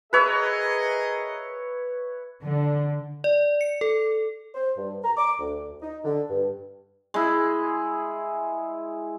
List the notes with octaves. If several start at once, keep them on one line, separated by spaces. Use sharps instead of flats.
G#4 A#4 B4 C#5 D#5 E5
D3
D5
C#7
A4
C5
G2
A#5
D6
D2
D#4
D3
G2
G#3 E4